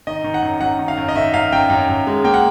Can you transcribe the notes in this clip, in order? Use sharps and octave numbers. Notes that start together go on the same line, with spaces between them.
D#3 D#5
D#3
F#5
F#2
F#2 F#5
D#3
F5
F#2
D#5
D#3 E5
F#2 F5
F#2 G5
F#2
F#2
G#3
A#3 G5
F#5